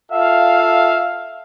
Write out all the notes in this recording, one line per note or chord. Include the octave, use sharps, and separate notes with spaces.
F4 A4 E5 F5